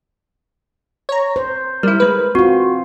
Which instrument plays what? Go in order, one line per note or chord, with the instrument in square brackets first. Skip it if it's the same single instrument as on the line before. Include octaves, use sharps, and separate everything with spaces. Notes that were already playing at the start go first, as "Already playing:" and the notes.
[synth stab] C#5 A#5
[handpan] C5
[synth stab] G3 E4 [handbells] A#4
[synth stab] G#3 B4
[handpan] C4 F4 [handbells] F#4